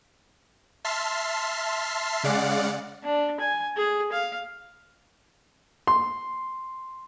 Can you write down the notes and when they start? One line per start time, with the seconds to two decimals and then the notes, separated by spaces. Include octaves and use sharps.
0.85 E5 A5 C6 F6 B6 C7
2.23 C#3 G#3 D5 F5 F#5
3.04 D4
3.40 G#5
3.77 G#4
4.12 F5
5.87 C6